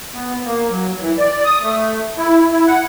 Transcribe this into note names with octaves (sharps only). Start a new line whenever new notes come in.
B3
A#3
F#3
E3
D5
D#6
A3
E4
E4
F#5